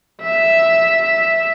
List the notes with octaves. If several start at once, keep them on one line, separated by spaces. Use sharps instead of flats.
E5